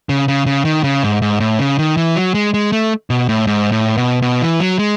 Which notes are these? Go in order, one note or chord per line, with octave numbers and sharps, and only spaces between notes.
C#3
C#3
C#3
D#3
C#3
G#2
G#2
A2
C#3
D#3
E3
F#3
G#3
G#3
A3
B2
A2
G#2
A2
B2
B2
E3
F#3
G#3